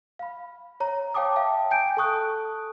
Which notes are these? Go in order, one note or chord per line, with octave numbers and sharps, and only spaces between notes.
F5 B5
C#5 A#5
C#5 F5 G5 A5 D6 D#6
E5 F5 G5 A5
G5 G#5 G6 D7
A4 A5 C#6 D#6 F#6